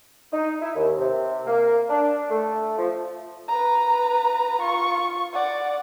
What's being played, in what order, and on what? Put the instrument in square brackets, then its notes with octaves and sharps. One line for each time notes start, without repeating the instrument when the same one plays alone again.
[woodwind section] D#4
E4
D#2
C3
A#3
D4
A3
F3
[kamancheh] B4 A#5
F4 C#6
D5 F#5